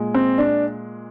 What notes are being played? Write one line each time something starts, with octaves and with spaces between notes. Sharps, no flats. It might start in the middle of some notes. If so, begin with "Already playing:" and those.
Already playing: A#2 G#3
C4
D4